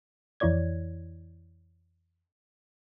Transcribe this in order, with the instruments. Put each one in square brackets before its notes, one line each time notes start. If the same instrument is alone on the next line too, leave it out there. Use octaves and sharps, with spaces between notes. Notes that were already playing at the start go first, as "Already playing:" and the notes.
[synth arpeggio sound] F2 E3 E4 C#5 D5 G#6